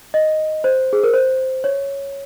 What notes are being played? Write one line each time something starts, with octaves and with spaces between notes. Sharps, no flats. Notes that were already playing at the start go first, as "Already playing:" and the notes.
D#5
C5
G#4
A#4
C5
C#5